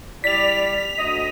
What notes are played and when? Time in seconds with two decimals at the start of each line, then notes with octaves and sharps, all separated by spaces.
0.24 G3 E4 D5 B6 F7
0.98 D2 D#5